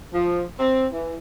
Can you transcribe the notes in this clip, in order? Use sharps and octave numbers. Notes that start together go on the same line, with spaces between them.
F3
C4
E3